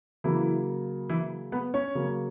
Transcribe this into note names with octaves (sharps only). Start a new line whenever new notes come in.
C#3 E3 F#3 A#3 E4
E3 E4
B3 B4
C#4 C#5
C#3 F#3 A#3